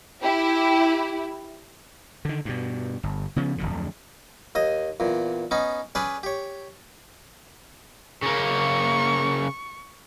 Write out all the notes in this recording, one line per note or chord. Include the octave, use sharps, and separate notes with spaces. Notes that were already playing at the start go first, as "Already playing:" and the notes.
E4 G4
D3 D#3
G2 B2
G1
C#3 F3 B3 C#4
D1 G1 F2 D3
D#2 D#5 D#6
E2 A#2
B3 C#4 D#4
C#4 G#4 B4 D5
G4 C#5
C#3 A#3 C#6